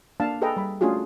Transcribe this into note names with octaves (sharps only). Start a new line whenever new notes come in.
A#3 D4 F5 A5
G#4 A4 B4 D#5 G5 A#5
G3 B5
A3 C#4 D4 F4 F#4 G#4